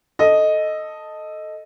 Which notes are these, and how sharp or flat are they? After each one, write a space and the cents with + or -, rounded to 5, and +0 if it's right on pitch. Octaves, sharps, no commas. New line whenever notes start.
A4 +0 D#5 +0